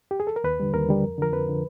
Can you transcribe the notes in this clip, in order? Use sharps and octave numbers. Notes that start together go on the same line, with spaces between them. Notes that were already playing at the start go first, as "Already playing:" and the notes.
G4
G#4
A4
A#4
D#2 B4
D3 G3
D#2 A#4
D3 G3
F2
D3 F3 A#4
F2 B4
D3 F3